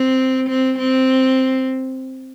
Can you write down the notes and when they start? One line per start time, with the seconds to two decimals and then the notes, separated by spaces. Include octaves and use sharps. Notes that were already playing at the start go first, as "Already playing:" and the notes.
Already playing: C4
0.49 C4
0.79 C4